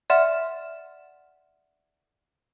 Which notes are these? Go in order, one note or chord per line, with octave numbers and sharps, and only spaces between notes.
D5 E5 F#5 C6 F6 E7